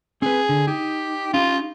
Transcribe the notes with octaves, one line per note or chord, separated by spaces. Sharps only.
C4 G#4 B4
D3
D#4 G4
C#4 D#4 F4 G4